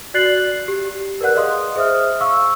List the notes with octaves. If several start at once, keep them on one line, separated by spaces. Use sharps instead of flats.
F#4 D5 F#6 A6 C7 F#7
G4
A#4 B4 D5 F#5 F#6
G#4 D#5 F5 C6 D#6
G#4 C5 E5 D#6 F6
F5 C#6 E6